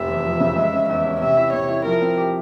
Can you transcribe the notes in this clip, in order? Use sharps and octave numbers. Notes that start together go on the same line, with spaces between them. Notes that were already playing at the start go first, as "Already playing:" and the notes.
Already playing: F1 E5
E2
F3
C#3
G#3
C#4
E2 E5
C#4
C3 E5
E4
C3 C#5
E4
F3 A#4
C4
G4